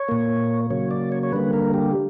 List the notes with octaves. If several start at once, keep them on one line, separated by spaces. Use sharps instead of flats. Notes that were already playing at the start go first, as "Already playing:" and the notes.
Already playing: C#5
A#2 A#3
C#3 F#3 A#3 C#5
D5
C#5
C#5
D3 G3 A#3 B4
A#4
G4